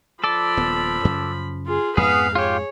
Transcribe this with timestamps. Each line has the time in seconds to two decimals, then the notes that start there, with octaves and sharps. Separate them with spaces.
0.24 F3 A4 D5 B5
0.57 D#1 B3
1.05 F#2 C#3
1.66 F4 G#4
1.97 F2 G#2 B3 G#4 B4 F5
2.35 F4 G4 G#4 C#5